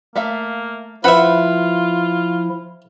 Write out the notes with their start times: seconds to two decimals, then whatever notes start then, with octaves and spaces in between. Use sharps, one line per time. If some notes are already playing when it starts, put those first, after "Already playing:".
0.16 A3 A#3 E5 F5
1.04 F3 E4 F4 B4 C5 E5 F#5 B5